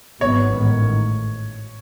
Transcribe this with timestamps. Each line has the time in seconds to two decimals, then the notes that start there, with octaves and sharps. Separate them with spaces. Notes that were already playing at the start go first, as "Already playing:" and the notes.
0.21 G#1 G#2 F#3 B3 C#5
0.55 A1 G#2 D#3